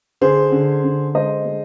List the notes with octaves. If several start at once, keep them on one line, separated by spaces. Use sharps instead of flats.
D3 G#4 C5
D3
D3
G#3 C5 D#5
G#3